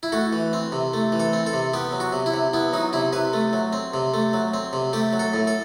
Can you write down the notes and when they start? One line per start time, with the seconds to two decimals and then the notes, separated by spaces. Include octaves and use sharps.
0.03 E4
0.12 A3 F#4
0.33 E3
0.53 C4
0.72 C3
0.94 A3
1.12 E3
1.20 A4
1.33 C4
1.46 A4
1.53 C3
1.74 B3 G4
1.92 F#3
2.00 F#4
2.13 C3
2.26 E4
2.34 C3
2.53 B3 E4
2.73 F#3 D#4
2.93 C3 E4
3.13 C3 B4
3.33 A3
3.53 F#3
3.73 C4
3.94 C3
4.14 A3
4.33 F#3
4.54 C4
4.73 C3
4.93 A3 G4
5.13 F#3
5.19 A4
5.34 A2
5.47 A4